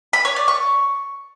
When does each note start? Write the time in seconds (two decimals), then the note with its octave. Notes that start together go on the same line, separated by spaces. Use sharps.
0.13 B5
0.25 C#5
0.36 D5
0.48 C#6